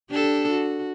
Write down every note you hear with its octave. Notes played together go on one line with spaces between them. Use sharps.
D4 G4 A4
F#4